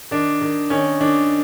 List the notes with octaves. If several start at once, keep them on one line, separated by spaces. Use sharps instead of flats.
D#3 D4
D#3
D#3 C#4
D#3 D4